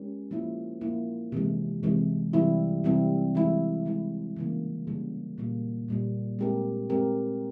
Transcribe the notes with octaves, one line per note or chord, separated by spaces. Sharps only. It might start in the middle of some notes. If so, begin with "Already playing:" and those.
Already playing: G#3 C#4 G4 A#4
F3 A#3 E4
F3 A#3 E4
C3 E3 G#3
C3 E3 G#3
C3 E3 G3 C4 E4
C3 E3 G3 C4 E4
E3 G#3 E4
E3 G#3 E4
C#3 E3 G3 A#3
C#3 E3 G3 A#3
A#2 G3 A#3
A#2 G3 A#3
G#3 C4 G4 A#4
G#3 C4 G4 A#4